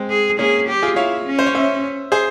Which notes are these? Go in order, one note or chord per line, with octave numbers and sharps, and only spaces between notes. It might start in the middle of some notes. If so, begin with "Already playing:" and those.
Already playing: G#3 C4
G#4
A#3 C#4 G#4
G4
F4 G#4
E4 C#5 F5
C#4
C5
C#5
C5 E5
G#4 C5